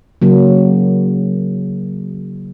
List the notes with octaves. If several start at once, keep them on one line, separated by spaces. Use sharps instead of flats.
C#3 F#3 A#3